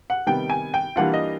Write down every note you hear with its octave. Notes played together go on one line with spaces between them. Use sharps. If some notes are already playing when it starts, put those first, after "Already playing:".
F#5
C3 D#3 G3 B3 G5
G#5
G5
E3 G3 A#3 D4 F4 F#5
D#5